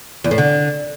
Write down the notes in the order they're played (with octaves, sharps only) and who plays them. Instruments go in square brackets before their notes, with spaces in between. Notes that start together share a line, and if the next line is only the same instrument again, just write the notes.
[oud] E2
A2
D3